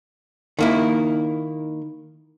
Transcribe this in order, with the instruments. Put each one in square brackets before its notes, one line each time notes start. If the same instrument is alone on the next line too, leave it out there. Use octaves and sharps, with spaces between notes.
[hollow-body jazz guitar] D#3 A#3 E4